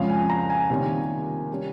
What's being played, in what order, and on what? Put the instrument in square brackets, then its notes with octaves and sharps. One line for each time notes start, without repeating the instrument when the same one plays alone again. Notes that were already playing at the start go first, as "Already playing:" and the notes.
Already playing: [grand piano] F2 C#3 G#3 C#4 F5
G#5
A#5
G#5
C3 D#3 G3 A#3 C#4
G3 C#4